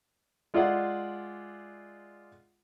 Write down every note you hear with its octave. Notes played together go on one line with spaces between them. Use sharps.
G#3 F4 D5 E5 F#5